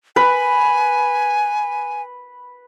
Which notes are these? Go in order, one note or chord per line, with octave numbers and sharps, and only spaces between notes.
B4 G#5